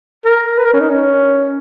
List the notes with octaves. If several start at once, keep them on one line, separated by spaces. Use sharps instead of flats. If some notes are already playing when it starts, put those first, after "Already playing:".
A#4
B4
A#4
C#4
D#4
C#4